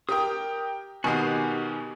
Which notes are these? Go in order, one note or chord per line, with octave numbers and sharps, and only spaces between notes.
G4 A#4 G5 D#6
B2 D#3 B3 F#4 G4 G#5 C7